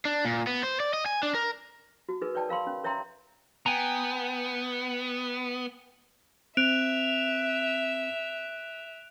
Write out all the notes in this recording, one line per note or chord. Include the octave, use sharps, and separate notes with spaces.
D4
A#2
B3
C5
D5
D#5
G#5
D4
A#4
F#4
D#4 G#4 A#4 B4
B4 C#5 D5 G5 A5
A#4 F5 B5 C6
C#4
A#4 C#5 E5 G5 A#5 C6
B3 G5 G#5 A#5
C4 E5 F#6 D7 F7